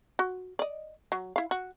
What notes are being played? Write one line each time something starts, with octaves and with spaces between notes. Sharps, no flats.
F#4
D5 D#5
F#3
E4 F5
F#4